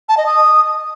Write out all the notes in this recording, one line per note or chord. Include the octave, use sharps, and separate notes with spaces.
A5
D#5
D#6